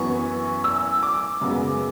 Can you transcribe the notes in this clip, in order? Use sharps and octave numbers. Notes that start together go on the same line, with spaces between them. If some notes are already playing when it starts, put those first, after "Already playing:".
Already playing: F#2 E3 B3 C#6
E6
D6
F#2 C#3 G#3 B3